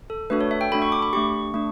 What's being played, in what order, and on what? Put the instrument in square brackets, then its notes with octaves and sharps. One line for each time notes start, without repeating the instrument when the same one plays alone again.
[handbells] A4
A3 D4 F#4 A4 B4
C#5
E5
G5
A3 D4 F#4 A4 B5
C#6
D6
B5
A3 D4 G4 C#6
A3 D4